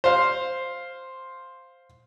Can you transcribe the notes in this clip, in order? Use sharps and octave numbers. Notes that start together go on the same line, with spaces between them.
C5 F5